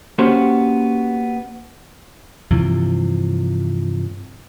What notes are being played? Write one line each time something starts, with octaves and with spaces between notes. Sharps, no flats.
A#3 B3 C#4 F#4 G4 C5
G2 C3 E3 F3